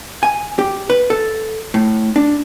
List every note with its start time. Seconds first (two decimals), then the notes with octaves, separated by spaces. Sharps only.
0.23 G#5
0.59 G4
0.90 B4
1.10 A4
1.74 A2
2.16 D4